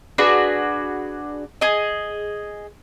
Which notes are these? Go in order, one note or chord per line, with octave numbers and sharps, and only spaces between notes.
D4 F#4 G#4 B4
G#4 D#5